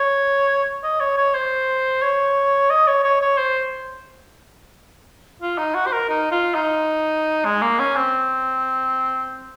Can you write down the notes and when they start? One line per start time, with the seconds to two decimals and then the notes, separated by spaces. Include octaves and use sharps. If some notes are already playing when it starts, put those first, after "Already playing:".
Already playing: C#5
0.84 D#5
1.00 C#5
1.17 C#5
1.34 C5
2.02 C#5
2.70 D#5
2.87 C#5
3.04 C#5
3.21 C#5
3.38 C5
5.42 F4
5.58 D#4
5.75 F#4
5.86 C5
5.93 A#4
6.09 D#4
6.31 F4
6.55 D#4
7.45 G#3
7.62 A#3
7.79 C#4
7.96 C4